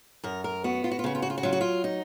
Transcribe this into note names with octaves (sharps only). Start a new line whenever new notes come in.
F#2 A#4
A#4
B3 F#4
F4
F#4
F4
C#3 F#4
F4
F#4
F4
F#4
F#3 F4
F#4
F4
D#4